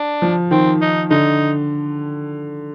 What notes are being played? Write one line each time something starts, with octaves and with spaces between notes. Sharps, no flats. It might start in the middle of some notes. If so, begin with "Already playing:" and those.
Already playing: D4
F3
D#3 C4
D#4
D3 D#4